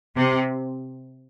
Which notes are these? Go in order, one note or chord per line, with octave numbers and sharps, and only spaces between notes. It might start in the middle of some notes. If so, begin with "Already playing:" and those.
C3